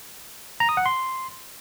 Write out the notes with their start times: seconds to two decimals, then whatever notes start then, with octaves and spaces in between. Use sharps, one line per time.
0.60 A#5
0.69 D#6
0.77 F#5
0.86 C6